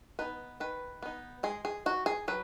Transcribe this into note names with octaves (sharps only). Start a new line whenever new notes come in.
B3 D#4 B4
D#3 B4
B3 D#4
G#3 G#4
G#4
D#4 F#4
G#4
F#3 B4